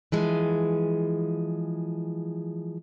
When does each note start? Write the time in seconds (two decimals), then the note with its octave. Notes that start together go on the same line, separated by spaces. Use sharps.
0.12 E3 F3 G#3